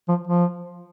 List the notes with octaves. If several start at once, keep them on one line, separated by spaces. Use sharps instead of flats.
F3
F3